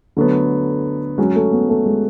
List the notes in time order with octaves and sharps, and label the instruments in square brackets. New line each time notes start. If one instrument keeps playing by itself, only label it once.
[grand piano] D3 F#3 B3 [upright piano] A3
[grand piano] F#3 C#4 F#4 [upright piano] G#3
[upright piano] A3
B3
A3
G#3